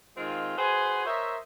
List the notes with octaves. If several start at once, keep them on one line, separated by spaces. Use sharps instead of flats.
D#3 G#3 C4 F4
F#4 G#4 B4 C5 G#5
A#4 C5 C#5 D#5 E5